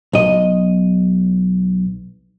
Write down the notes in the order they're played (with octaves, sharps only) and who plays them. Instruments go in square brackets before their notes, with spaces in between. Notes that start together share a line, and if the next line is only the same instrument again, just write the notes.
[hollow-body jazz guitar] B1 D#5